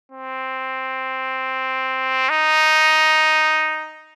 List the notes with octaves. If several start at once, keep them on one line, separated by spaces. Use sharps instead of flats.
C4
D#4